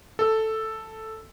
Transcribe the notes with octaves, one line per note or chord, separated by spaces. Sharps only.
A4